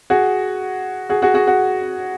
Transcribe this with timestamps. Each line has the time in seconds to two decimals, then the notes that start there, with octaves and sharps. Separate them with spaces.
0.10 F#4 G#4
1.09 F#4 G#4
1.22 F#4 G#4
1.34 F#4 G#4
1.47 F#4